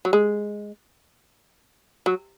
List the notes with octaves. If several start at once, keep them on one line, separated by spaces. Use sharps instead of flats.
F#3
G#3
F#3